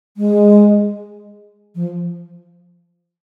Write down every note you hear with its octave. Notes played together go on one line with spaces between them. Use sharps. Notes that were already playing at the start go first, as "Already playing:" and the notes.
G#3
F3